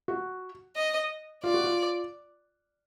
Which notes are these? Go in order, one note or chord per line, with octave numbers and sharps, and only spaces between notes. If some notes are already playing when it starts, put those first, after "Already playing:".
F#4
D#5
F4 D5
F#4
F4